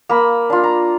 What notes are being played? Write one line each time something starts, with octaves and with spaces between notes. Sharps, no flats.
A#3 B5
D4 F4
A#5